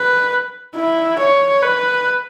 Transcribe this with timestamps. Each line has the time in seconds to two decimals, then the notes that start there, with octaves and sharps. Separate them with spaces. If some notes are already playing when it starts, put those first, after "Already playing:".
Already playing: B4
0.75 E4
1.19 C#5
1.63 B4